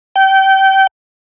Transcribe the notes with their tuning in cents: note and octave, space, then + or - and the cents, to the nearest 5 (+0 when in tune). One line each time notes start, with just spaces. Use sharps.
G5 -25